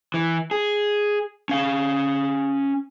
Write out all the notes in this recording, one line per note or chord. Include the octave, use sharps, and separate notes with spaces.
E3
G#4
C#4 F5